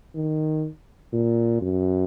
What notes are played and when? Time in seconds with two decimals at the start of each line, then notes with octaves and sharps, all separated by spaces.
0.15 D#3
1.13 A#2
1.62 F#2